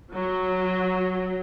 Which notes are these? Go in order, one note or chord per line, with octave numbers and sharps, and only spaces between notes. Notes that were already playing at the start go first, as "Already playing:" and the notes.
F#3